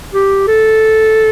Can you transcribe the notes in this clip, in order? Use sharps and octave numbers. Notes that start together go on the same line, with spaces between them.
G4
A4